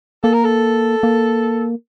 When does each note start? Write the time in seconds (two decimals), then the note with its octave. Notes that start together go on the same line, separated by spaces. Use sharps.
0.24 A#3 A4
0.33 A#4
0.44 A4
1.03 A#3